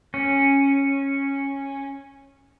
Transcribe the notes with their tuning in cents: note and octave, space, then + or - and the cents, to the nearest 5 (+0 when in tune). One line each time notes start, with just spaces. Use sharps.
C#4 -10